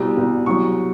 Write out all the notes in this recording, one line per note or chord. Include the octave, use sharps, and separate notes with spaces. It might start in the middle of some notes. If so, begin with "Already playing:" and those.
Already playing: C2 B2 G3
C2 B2 G3
C2 B2 F#3 C#6